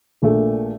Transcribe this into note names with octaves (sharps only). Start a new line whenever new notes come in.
A#1 A#2 A3